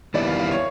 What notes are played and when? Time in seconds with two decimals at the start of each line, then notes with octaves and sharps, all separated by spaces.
0.14 D#3 G3 B3 E4 D5
0.27 F5
0.40 F5
0.52 C#5